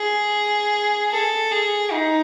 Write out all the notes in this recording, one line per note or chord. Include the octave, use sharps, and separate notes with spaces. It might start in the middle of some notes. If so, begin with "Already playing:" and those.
Already playing: G#4
A4
G#4
D#4